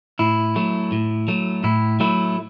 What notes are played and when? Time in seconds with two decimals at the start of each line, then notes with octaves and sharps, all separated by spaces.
0.19 A2 E4
0.56 F#3 A3
0.92 A2
1.28 F#3 A3
1.64 A2 E4
2.00 F#3 A3 E4